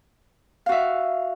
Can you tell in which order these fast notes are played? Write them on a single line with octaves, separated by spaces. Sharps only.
F5 F#4 E5